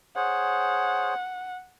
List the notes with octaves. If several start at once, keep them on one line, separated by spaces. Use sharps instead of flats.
G#4 C5 C#5 F#5